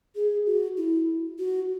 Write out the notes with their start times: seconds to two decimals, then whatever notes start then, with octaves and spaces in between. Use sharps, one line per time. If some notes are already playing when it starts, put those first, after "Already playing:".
0.16 G#4
0.46 F#4
0.77 E4
1.38 F#4